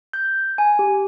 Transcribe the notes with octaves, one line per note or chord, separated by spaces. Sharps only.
G6
G#5
G4